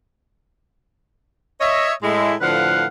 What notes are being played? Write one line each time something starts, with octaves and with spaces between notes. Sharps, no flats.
C#5 D#5 E5
A2 G#3 E4
A2 D3 F3 B4 F5 F#5